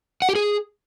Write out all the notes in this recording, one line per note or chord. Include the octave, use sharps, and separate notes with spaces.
F#5
G4
G#4